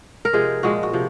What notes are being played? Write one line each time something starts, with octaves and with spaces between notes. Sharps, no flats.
A#4
C3 F3 G#3 G#4
A#2 F3 G#3 F#4
F#4
C3 F3